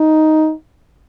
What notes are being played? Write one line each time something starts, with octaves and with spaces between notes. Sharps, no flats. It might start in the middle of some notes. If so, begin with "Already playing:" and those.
Already playing: D#4